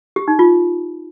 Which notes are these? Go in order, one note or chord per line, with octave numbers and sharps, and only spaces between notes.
G4
D#4
F4